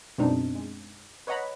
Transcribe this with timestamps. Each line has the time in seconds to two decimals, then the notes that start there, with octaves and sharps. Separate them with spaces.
0.18 F#2 B2 G#3 C4 D4 D#4
0.55 G#3
1.27 B4 C#5 D#5 F#5 A#5 B5